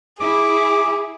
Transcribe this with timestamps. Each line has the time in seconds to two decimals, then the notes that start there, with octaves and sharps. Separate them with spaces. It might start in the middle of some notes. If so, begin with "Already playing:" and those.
0.20 E4 G#4 D6